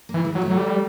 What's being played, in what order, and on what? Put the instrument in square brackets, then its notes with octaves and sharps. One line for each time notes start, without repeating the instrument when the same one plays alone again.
[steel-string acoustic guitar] A#3
[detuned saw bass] E3
[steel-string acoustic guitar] G#3
[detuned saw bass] F#3
[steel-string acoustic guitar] A3
[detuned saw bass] F#3
G3